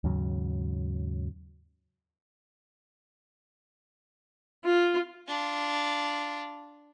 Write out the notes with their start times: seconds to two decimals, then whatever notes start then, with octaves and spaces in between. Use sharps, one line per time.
0.04 D#2 G#2 C#3 F#3
4.65 F4
5.29 D4 F4